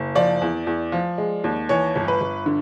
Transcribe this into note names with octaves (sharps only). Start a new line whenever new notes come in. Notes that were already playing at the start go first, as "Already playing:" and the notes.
Already playing: F#1
F3 D5
E2
E2
F3
G#3
D#2
E3 C#5
G1
B4
G1
D3